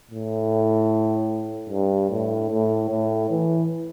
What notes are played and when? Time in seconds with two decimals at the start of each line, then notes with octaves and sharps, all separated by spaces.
0.11 A2
1.70 G2
2.10 A2
2.51 A2
2.90 A2
3.30 E3